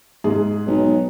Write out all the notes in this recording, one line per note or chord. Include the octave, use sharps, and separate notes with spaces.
G#2 G#4
B1